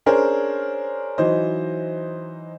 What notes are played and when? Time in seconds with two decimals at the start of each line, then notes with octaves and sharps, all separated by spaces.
0.06 C#4 D4 G#4 A#4 C5 C#5
1.18 E3 F#3 D#4 C5 D#5